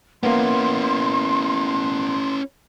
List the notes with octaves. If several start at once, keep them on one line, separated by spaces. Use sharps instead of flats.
A#3 B3 C#4 E4 C6